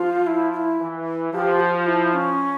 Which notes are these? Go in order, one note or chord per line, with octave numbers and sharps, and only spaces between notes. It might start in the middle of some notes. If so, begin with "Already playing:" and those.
Already playing: F3 F4
E4
F4
E4
E3
F3 G4
F4
E4
C#4